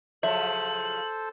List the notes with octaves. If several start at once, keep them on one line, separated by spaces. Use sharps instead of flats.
C#3 F3 F#3 A4 C5 E5 F#7